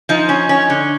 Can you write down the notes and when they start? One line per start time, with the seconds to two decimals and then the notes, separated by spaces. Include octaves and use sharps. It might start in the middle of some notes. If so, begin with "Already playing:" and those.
0.09 F3 D#4
0.29 C#4
0.49 C#4
0.70 D3